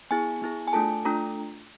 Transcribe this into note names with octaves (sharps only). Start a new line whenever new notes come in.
B3 E4 G#4 G#5
B3 E4 G#4
G#5
A3 D4 F4 A4 A5
A3 D4 F4 A4 A#5